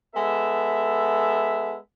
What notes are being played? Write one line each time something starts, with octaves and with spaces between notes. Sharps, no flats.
G#3 B3 A4 E5